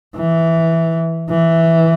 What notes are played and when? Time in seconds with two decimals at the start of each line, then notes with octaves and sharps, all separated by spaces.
0.15 E3
1.30 E3